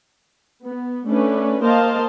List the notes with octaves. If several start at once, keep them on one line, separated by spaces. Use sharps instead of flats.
B3
A3 C#4 D4 B4
A#3 A#4 C5 D#5 F5 A5